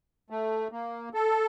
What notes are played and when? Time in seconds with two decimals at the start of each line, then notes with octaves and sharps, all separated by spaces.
0.30 A3
0.72 A#3
1.14 A4